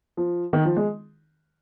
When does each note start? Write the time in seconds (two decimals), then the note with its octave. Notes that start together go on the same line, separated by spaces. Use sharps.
0.17 F3
0.53 D#3
0.65 F3
0.77 G#3